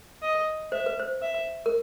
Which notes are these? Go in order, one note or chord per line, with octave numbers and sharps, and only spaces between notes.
D#5
C5 E5
B4
C5
E5
A#4